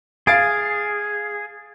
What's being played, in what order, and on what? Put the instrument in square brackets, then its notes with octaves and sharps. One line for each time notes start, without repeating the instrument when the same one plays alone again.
[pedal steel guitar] G#4 [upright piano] F5 A6 D7